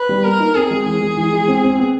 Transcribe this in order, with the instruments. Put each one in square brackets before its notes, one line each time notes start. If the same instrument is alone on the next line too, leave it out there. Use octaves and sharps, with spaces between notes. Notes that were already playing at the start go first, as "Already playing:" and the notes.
Already playing: [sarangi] B4
[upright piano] G3
[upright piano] A#3 [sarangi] A#4
[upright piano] D#4
[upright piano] C4 [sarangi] G#4
[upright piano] G#3
[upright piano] E3 [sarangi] G#4
[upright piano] G#3
E3
G#3
C4
C4
B3